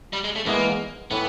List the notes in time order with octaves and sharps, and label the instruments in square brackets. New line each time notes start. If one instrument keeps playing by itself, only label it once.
[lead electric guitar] G3
G#3
A3
[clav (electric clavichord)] E3 G#3 B3 [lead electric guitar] A#3
[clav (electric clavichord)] A2 E3 [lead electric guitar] B3